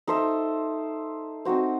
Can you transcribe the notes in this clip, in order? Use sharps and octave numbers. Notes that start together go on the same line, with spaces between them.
D#4 A4 C5 E5
C4 D#4 F#4 C5